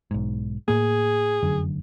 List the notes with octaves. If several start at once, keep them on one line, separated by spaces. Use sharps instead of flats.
B1 G#2
A2 A#3 G#4
F1 F#2 D3